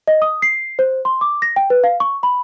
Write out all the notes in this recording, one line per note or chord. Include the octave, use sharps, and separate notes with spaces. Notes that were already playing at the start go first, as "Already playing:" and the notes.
D#5
D#6
C7
C5
C6
D6
A#6
G5
B4
F5
C#6
B5